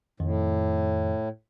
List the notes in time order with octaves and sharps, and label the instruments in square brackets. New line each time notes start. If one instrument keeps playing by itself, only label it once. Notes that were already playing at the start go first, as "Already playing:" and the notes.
[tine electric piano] F2 D#3 [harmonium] A2